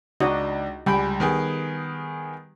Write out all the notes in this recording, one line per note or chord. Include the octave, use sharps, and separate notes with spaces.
C#2 D4 D#4 F#4 D#5
C#2 G3 G5 G#5 B5
D#3 B3 G#4